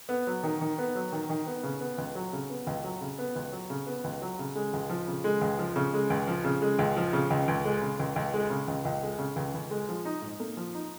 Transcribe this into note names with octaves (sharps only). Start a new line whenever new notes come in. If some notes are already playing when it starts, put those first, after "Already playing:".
B3
F#3
D#3
D#3
B3
F#3
D#3
D#3
B3
C#3
B3
C#2
F#3
C#3
B3
C#2
F#3
C#3
B3
C#2
F#3
C#3
B3
C#2
F#3
C#3
G#3
C#2
F3
C#3
G#3
C#2
F3
C#3
G#3
C#2
F3
C#3
G#3
C#2
F3
C#3
C#2
C#2
G#3
C#3
C#2
C#2
G#3
C#3
C#2
C#2
G#3
C#3
C#2
C#2
G#3
F3
D#4
G#2
A#3
F3
D#4